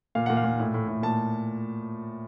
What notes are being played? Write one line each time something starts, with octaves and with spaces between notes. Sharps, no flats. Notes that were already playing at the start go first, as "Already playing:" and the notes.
A#2 F5
A#2 F#5
F5
A#2
A2
A2
A2
A#2 A5